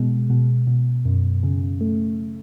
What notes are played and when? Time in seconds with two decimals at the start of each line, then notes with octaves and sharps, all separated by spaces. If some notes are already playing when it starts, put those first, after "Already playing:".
Already playing: B2 G#3
0.30 B2
0.67 B2
1.05 F#2
1.43 C#3
1.81 A3